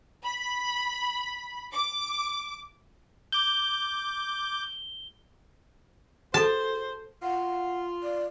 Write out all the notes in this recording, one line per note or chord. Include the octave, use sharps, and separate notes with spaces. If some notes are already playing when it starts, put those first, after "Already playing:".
B5
D6
D6 G6 G7
F#4 G#4 A4 C5 A5
F4 F#5
D5